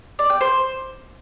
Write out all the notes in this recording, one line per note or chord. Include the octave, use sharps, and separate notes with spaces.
D5
G5
C5